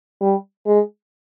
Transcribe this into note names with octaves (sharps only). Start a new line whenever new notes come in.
G3
G#3